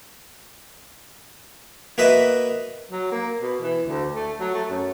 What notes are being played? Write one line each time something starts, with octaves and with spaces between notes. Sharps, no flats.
A#3 F#4 B4 D#5 E5
F#3
A#3
B2
E3
D2
A3
F#3
A3
F#2